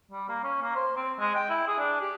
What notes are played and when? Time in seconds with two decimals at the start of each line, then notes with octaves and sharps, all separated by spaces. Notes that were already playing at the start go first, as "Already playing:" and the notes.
0.11 G3
0.28 A#3
0.43 C#4
0.62 A#3
0.75 C5
0.96 C4
1.19 G#3
1.35 G5
1.50 E4
1.67 G#4
1.79 D4
2.01 G4